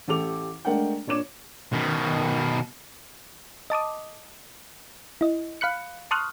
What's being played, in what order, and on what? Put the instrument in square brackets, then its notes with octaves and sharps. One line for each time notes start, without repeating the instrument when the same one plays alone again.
[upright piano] A1 G4 A4 D6 F7
G#3 A3 D4 A#4 F#5 G5
A#2 D4 C#5 D6 E7
[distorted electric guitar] B2 D#3
[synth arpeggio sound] D#5 A5 D6 D#6
E4 D#5
F5 B5 F#6 C#7
A5 C6 C#6 D#6 F6 F#6